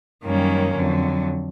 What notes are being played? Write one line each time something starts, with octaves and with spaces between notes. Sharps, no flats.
F#2 D#3 G3 A#3 C#4
F2 D3 F#3